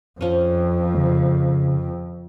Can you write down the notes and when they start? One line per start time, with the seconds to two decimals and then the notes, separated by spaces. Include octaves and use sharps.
0.21 F2 F3 C#4
0.94 C#3